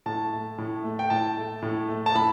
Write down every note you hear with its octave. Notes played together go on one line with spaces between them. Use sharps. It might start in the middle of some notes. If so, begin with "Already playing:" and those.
A2 A5
A3
A2
A3
G5
A2 A5
A3
A2
A3
A5
A2 B5